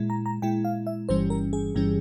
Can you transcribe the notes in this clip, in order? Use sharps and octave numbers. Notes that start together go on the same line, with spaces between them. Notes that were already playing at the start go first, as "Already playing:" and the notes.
Already playing: A#2 G#3 E4
A#5
A#5
A#2 G#3 E4 G5
F5
E5
G1 G2 E3 G3 C#4 C5
A#4
G#4
G1 G2 E3 G3 C#4